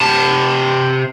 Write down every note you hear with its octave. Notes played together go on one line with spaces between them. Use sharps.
C3 A5